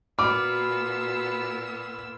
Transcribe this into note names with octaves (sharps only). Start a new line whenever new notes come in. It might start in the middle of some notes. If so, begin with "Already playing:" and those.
A#2 B3 F#4 B5 D6 E6 F6